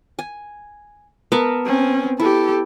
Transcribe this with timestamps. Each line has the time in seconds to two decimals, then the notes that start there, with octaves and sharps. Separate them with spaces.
0.19 G#5
1.32 B3 A#4 E5 A5
1.66 C4 C#4
2.20 E4 G4 A4